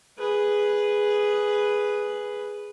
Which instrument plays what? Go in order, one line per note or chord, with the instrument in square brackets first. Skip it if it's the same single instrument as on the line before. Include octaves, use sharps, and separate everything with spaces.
[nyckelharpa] G#4 B4